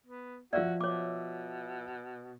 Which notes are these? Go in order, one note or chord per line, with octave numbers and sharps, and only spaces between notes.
B3
F3 F#4 D5 E5 F5
B2 C#5 D6